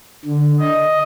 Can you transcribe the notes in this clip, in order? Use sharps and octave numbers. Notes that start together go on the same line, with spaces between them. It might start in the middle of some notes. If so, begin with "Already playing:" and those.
D3
D#5